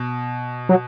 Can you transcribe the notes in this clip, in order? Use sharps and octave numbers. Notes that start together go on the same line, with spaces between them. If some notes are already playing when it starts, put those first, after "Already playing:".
Already playing: B2
F#3